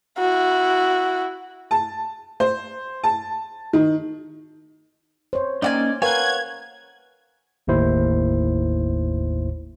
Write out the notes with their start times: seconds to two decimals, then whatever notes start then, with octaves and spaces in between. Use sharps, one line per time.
0.18 E4 F#4
1.71 A5
2.40 C5
3.04 A5
3.73 D#3
5.33 C5 C#5
5.62 A#3 C#4 D#4 D5 F#5 G#5
6.02 A#4 B4 C#5 F5 F#5 G#5 G#6
7.67 G1 D#2 A2 E4 C5